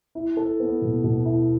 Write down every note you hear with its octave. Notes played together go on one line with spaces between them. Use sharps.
E4
A4
B3
B2
B2
E4